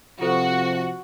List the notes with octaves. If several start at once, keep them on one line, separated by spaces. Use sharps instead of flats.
C3 F3 F4 F#4 A4 C5